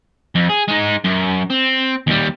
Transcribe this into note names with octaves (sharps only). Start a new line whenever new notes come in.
F2
G#4
G#3 D#4
F#2
C4
D#2 G3